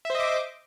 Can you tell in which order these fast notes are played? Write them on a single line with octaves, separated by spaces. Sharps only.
E5 C5 D#5 D6